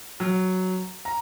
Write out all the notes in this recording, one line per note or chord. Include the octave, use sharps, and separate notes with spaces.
F#3
A#5